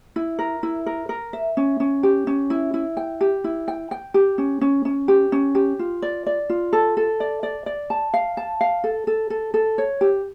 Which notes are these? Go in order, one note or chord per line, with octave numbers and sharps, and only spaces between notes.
E4
A#4
E4
A#4
A#4
E5
C#4
C#4
G4
C#4
E4
E4
G5
G4
E4
G5
G5
G4
C#4
C#4
C#4
G4
C#4
G4
F4
D5
D5
F4
A4
A4
D5
D5
D5
A5
F5
A5
F5
A4
A4
A4
A4
C#5
G4